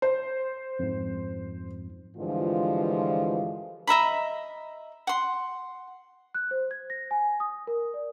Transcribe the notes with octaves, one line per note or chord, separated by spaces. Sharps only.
C5
F2 G#2
G2 D3 E3 F3 G#3 F4
D#5 E5 A#5 B5
F#5 C6
F#6
C5
G#6
A#6
G#5
D#6
A#4
D5